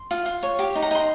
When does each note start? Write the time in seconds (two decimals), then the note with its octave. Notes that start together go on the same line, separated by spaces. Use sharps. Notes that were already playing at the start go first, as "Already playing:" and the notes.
Already playing: C6
0.11 F4
0.26 F4
0.43 C#5
0.59 G4
0.75 D#4
0.82 A#5
0.91 D#4 C6